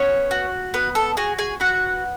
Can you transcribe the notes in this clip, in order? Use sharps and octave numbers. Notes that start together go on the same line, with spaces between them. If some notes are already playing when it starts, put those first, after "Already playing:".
Already playing: B3 C#4 C#5
F#4
B3 B4
A4
F#4 G#4 G#5
G#4 G#5
B3 F#4 F#5